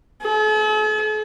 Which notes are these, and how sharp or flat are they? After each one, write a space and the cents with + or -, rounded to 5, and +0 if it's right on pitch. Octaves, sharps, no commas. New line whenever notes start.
A4 -45